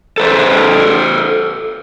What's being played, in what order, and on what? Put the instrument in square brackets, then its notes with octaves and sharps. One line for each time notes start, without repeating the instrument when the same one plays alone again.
[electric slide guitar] A4 B4 C5